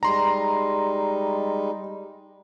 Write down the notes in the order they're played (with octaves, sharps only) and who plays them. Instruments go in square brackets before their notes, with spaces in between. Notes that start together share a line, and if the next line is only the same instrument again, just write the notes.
[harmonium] G3 G#3 D#4 [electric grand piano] A#5 C6